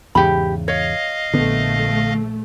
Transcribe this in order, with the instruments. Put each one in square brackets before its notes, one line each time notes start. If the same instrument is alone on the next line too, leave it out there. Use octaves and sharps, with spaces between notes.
[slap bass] E2 G#2 C#3 [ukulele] G4 B5
[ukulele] C#5 [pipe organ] D#5 F5
[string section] A#1 A3 [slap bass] D3 B3